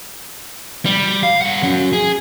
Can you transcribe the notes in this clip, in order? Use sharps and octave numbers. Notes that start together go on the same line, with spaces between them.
G3
F5
G3 F#5
F#3 C#4
G#4